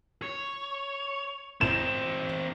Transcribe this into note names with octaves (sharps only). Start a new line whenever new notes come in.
C#5
C4 D#4 E7